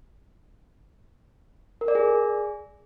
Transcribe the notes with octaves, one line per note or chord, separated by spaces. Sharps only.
A#4
D5
G#4